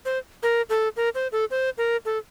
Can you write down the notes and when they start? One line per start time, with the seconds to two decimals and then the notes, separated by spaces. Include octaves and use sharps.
0.05 C5
0.43 A#4
0.70 A4
0.96 A#4
1.15 C5
1.32 A4
1.51 C5
1.78 A#4
2.05 A4